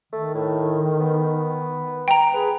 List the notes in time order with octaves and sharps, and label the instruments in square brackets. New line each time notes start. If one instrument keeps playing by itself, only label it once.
[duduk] D#3 [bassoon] A3
[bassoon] A2
B3
[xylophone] G5 A#5
[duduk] G#4 [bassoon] B4